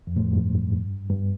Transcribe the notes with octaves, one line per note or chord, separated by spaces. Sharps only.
F2
A2
F2
G2
G2